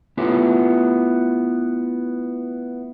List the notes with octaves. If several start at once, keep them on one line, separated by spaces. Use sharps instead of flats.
A3 B3 C#4 E4 F4 G4